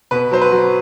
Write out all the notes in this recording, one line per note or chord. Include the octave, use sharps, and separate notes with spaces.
B2 B4
F#3 C5
B4
F#3